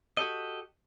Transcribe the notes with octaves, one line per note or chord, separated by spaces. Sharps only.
F#4 G4 A4 D#5